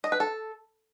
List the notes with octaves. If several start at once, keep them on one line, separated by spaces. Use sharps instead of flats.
D#5
B4
A4